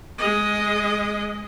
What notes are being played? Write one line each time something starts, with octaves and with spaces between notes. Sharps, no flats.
G#3 D#5